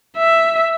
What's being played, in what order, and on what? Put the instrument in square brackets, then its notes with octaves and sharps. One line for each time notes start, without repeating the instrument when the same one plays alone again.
[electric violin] E5